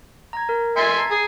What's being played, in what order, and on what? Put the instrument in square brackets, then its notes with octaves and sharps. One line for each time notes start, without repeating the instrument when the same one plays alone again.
[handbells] A#5 G#6
A#4
[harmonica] E5 G#5 C6 [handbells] A6 C#7
[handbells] A5 A#5 G#6
[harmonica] G#4